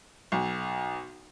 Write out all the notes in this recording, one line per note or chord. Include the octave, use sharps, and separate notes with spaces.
B1